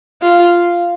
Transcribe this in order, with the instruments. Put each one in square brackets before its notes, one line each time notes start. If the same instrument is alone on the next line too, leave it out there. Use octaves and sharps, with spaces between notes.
[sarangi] F4